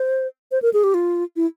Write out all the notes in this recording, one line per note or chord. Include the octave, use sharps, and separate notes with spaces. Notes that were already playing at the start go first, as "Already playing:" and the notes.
Already playing: C5
C5
A#4
G#4
G4
F4
E4